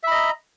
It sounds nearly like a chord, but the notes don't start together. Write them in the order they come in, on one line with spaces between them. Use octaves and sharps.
E5 B5 D#5 A#5